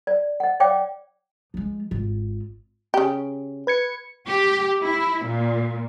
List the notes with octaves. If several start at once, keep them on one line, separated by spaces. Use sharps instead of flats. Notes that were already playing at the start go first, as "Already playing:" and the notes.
D5
D#5 F#5
C#5 D5 F5 G5 D6
F3 G#3
G#1 F4
C#3 G4
B4 G#6 C#7
G4
E4
A#2